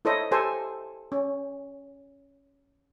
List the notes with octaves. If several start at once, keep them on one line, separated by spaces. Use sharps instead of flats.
E4 A4 C5 C#5 D#5
G4 A4 C5 G#5
C#4